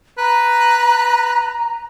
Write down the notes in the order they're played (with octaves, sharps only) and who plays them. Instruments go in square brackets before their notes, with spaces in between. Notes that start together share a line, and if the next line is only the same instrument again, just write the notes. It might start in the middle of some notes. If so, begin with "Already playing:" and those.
[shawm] B4 [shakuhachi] A#5